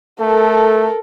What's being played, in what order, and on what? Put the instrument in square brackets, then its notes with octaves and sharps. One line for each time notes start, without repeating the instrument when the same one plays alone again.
[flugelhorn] A3 [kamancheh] A4 A#4